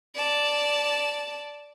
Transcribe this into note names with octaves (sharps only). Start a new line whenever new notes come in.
D5 A5